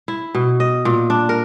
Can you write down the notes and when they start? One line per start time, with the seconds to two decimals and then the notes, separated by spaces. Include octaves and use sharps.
0.08 E4
0.35 B2
0.60 D#5
0.85 A#2
1.10 D4
1.29 A#4